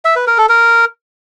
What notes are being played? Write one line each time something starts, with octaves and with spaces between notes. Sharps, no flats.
E5
B4
A#4
A4
A#4